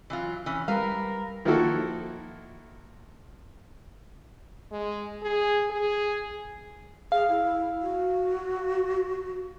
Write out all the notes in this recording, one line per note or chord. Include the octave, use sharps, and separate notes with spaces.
E3 F#3 F4
E3 C#4
G3 A#4 B4 F5
D#3 F3 A#3 E4 F#4 A4
G#3
G#4
G#4
G#4 F5
E4
F#4